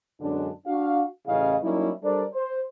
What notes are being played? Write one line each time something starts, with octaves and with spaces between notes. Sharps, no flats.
F#2 B2 D3 G#3 C#4 D4
D4 F#4 F5
A1 C#3 E4 D#5 F5
F#3 G3 A#3 C#4 D#4 E4
G3 D4 A4 A#4 C5 D5
C5